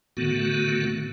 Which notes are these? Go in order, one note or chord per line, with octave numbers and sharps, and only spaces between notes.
A2 D3 D#3 A3 B3 F#4